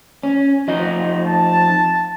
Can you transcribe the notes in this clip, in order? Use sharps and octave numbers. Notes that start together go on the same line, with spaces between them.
C#4
F2 D#4 D#5
A5